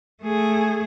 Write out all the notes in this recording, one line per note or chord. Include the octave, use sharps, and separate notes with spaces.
A3 G#4